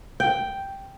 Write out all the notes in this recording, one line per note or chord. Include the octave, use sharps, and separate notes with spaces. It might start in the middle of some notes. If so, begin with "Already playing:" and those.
G5